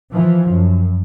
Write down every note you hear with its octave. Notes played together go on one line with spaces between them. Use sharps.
E3 F3
F#2